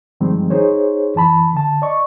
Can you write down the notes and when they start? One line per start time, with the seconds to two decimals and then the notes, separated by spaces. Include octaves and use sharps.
0.21 G2 D#3 F3 G3 G#3 C4
0.50 D#4 G#4 C5 C#5
1.15 F#2 E3 A5 B5
1.53 D3 A5
1.82 D5 D#5 C#6